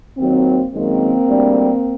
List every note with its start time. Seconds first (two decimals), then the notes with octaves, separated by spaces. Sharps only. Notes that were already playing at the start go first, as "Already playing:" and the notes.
0.18 D#2 D#3 F#3 A#3 C4
0.71 F#2 D#3 G#3 A#3 C4
1.25 D2 D3 G3